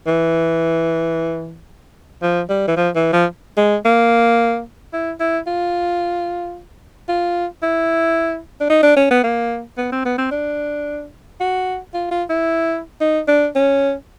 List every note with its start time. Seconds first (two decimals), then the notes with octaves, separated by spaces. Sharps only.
0.07 E3
2.23 F3
2.50 G3
2.68 E3
2.77 F3
2.96 E3
3.13 F3
3.57 G#3
3.85 A#3
4.93 E4
5.20 E4
5.47 F4
7.08 F4
7.63 E4
8.61 D4
8.70 D#4
8.83 D4
8.96 C#4
9.11 B3
9.24 A#3
9.78 B3
9.92 C4
10.05 B3
10.18 C4
10.31 D4
11.40 F#4
11.94 F4
12.11 F4
12.30 E4
13.01 D#4
13.28 D4
13.55 C#4